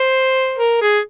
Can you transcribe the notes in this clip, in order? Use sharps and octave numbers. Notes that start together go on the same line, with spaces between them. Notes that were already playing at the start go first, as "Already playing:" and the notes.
Already playing: C5
A#4
G#4